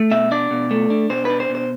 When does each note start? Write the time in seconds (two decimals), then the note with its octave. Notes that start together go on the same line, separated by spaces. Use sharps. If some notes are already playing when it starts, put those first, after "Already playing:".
Already playing: A3
0.11 B2 E5
0.31 D4 D5
0.51 B2
0.71 A3
0.90 D4
1.10 B2 C5
1.25 D4 B4
1.40 C5
1.49 B2
1.55 C5